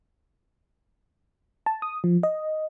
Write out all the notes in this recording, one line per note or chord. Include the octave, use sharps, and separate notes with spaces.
A5
D#6
F3
D#5